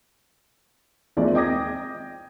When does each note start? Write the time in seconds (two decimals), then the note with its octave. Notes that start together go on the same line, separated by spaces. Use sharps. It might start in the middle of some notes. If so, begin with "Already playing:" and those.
1.17 D#2 F3 G#3 D5 E5
1.34 D#5 G5 D6 D#6 G#6 A#6